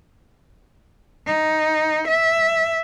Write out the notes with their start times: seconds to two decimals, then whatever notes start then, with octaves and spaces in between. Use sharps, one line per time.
1.26 D#4
2.08 E5